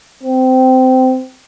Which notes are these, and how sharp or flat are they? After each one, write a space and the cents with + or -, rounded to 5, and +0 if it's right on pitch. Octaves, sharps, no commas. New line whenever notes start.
C4 -20